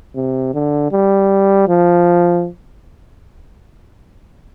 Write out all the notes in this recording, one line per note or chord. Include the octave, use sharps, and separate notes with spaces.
C3
D3
G3
F3